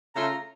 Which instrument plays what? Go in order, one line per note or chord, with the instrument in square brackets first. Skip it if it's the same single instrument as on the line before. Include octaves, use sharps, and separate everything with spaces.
[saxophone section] C#3 A3 C#4 F4 [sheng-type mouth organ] A#5